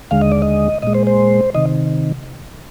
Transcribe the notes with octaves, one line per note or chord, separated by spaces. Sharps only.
D#2 D3 G#3 F5
D#5
D5
D#5
A#2 G#3 D#5
C5
C5
C3 D#3 D#5